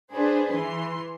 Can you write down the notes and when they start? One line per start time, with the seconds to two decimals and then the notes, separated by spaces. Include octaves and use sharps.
0.12 D4 G#4 B4 C5
0.54 E3 C6